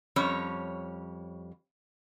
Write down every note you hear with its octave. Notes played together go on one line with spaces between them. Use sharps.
F2 G3 C#4 C#5